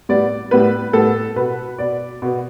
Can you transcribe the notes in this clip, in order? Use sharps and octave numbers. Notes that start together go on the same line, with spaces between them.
A2 G3 B3 D5
A2 G3 B3 B4
A2 G3 B3 A4
B2 B3 B4
B2 B3 D5
B2 B3